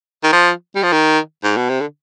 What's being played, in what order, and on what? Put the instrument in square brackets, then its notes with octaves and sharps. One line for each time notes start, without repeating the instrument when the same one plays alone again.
[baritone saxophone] D#3
F3
G3
F3
D#3
G#2
B2
C3
D3